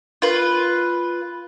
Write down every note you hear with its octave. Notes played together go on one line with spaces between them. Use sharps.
F4 B4